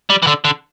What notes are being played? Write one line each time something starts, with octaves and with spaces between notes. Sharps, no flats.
G3
E3
D3
D3